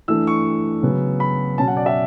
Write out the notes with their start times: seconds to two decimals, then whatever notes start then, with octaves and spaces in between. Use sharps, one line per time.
0.08 E3 A3 D4 E6
0.27 C#6
0.83 C#3 F#3 B3
1.20 B5
1.58 B2 F#3 C#4 A5
1.68 F#5
1.77 D5
1.86 E5